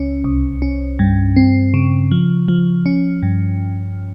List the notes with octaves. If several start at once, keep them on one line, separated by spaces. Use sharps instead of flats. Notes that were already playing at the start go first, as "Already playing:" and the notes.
Already playing: C#2 C#4
C2
C#4
G2
C4
C#3
F3
F3
C#4
G2